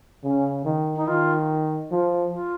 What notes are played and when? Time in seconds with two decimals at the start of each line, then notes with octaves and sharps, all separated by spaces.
0.24 C#3 C#4
0.65 D#3
0.96 D#4
1.08 D#3 F4
1.91 F3 F4
2.32 F4